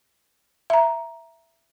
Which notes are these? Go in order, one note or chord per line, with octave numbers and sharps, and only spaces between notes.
E5 A#5